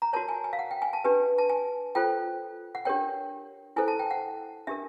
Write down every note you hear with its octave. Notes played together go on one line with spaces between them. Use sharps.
A#5
F#4 A#4 C#5 A5
G#5
G#5
F5
F#5
G5
G#5
A5
D4 G4 B4 G#5
A5
G#5
F4 A4 C5 G5
F#5
D4 G4 A#4 C#5 G5
E4 A4 C5 G#5
A5
G5
F#5
D4 G4 A#4 E5